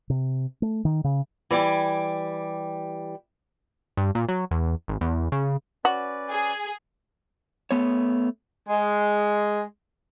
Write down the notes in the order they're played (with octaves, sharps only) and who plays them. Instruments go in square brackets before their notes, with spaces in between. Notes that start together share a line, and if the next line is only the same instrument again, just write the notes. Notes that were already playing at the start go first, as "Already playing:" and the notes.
[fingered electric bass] C3
A3
D#3
C#3
[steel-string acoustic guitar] E3 G3 G4 G#5
[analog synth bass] G2
A#2
F#3
E2
G#1
E2
C#3
[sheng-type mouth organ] C#4 B4 D5 [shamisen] F#4
[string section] G#4
[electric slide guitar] A3 B3 C#5
[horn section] G#3